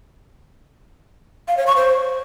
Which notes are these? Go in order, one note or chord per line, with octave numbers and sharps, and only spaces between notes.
F5
C#5
C#6
C5